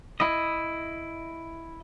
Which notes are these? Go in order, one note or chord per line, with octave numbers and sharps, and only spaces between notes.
E4 D#5